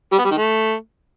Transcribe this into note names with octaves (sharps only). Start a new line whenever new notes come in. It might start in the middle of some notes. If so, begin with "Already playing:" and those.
G3
B3
G3
D#3
A3